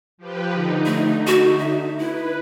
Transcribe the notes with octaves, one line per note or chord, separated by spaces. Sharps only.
F3 G4 B4
D3 D#4
A3
F#4
E5
E4 B4